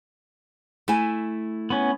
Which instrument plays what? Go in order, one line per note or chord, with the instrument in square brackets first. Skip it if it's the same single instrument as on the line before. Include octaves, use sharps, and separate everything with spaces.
[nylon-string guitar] A3 E4 G#5
[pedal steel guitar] B3 C#4